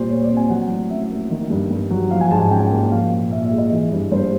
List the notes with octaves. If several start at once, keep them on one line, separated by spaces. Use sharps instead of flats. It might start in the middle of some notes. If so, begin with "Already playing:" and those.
Already playing: A#2 G3 C5
A#2 C#5
D5
C4
G#5
F#3 F#5
A2
C#4 E5
A#3
D#3
G2
G2
F#3
F3 F5
G#5
G#2 A5
G#5
C#4 G5
A#3
F3 F5
A#2
A#2 E5
E5
G#3
D#5
E3
G2
G2 C5